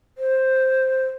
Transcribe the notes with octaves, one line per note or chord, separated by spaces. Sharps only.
C5